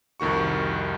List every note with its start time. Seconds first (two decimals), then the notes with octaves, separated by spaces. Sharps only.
0.20 C2 F2 D#3 F#4 C#6